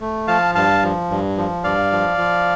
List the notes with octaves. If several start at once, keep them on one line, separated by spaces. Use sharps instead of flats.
A3
F3 F5 A5
G2 F5 A5
F3
G2
F3
G2 D5 F5
F3
F3